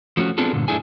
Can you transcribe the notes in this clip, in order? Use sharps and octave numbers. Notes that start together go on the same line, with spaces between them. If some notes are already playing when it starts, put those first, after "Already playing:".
F3 A3 C#4 F#4
B3 C4 D4 F4 G#4 A4
G2 A#2 D3
F#2 A3 D4 E4 G#4 G#5